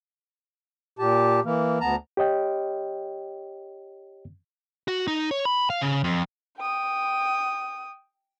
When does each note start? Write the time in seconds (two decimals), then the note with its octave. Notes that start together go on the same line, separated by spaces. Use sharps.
0.99 A#2 G4 A5
1.45 E3 A#3
1.81 D2 B3 A5 A#5
2.17 G4 C#5 D#5 G5
4.88 F#4
5.08 D#4
5.31 C#5
5.45 B5
5.70 F5
5.81 C#3
6.04 F2
6.58 G5 D#6